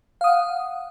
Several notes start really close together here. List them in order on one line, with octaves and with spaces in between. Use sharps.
F5 D#6 F#5